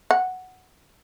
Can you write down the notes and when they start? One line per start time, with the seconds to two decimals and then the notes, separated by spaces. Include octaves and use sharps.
0.11 F#5